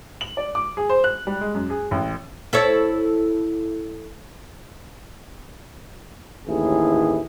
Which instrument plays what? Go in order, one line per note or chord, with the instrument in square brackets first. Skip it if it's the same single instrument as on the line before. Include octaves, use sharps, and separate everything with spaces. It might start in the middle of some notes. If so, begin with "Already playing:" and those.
[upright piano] F#7
D5
D6
G#4
C5
F#6
G3
G#3
F#2
G#4
A1
[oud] E4 A4 C#5
[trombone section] A1 D#2 A2 E4 G#4